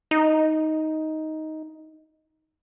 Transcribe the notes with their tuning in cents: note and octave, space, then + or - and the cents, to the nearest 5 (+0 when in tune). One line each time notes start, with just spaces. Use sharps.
D#4 +10